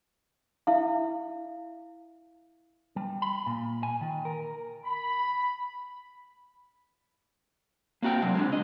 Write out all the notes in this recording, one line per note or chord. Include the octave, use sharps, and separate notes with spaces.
E4 E5 F5
G3
B5
A#2
G#5
D#3
A#4
B5
A#3 C4 F#4 E5 G5
C3 F#3 C4
G#3 C4 D4
C#2 D#5